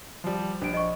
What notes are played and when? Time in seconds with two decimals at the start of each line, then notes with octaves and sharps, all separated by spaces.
0.24 F3 G3
0.61 A#1 D4 D7
0.74 D#5 C#6